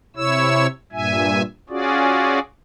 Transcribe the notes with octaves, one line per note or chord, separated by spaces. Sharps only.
C3 E4 C#5 E6
G2 A#2 E5 G#5
C#4 F4 F#4 G#4 D5